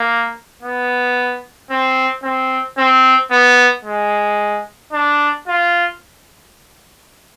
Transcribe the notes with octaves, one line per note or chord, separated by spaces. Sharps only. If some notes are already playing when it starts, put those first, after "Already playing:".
Already playing: A#3
B3
C4
C4
C4
B3
G#3
D4
F4